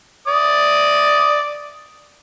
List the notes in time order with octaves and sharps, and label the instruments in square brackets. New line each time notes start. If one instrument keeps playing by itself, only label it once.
[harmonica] D5 D#6